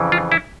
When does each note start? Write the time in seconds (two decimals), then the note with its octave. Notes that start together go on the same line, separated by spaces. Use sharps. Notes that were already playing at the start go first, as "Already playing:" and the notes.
Already playing: F2 C#3 E3
0.12 F4
0.32 E4